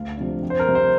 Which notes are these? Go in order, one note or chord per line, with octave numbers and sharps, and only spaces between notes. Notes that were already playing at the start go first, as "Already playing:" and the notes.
Already playing: D2 F5
C3 F3 D4
F2
C5
A#4
C3 G3 C4
C5